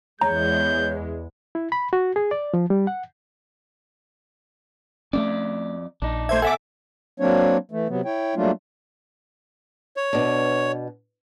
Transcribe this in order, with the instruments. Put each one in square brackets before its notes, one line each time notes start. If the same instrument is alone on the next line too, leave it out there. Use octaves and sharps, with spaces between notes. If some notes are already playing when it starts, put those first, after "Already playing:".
[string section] E2 G#3 [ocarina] C#5 [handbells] A#5 [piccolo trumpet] G6
[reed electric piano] E4
B5
F#4
G#4
D5
F3
G3
F#5
[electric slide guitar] F2 D5 [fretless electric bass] A3 A#3 C#4
[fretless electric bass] A#1 [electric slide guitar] D4 D#4
[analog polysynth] A3 C5 G#6 [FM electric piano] E5
[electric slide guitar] B2 F#5 [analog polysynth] A4 E5 D6 [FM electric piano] G#5
[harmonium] F#3 A#3 C4 D4 C#5
E3 A3
C3 F#3 B3
E4 C#5 G5
F#3 G3 A3 A#3 D4 F4
[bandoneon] C#5
[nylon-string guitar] B2 D4